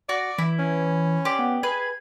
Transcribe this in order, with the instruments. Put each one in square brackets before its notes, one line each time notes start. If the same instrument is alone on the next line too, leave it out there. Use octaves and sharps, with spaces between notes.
[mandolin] F#4 [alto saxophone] D5 [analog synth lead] A#6
[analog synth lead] E3 [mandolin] E4
[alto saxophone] C#4
[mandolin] G4 D5 [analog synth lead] C6
[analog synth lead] B3
[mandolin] G#4 B4 [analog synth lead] G#6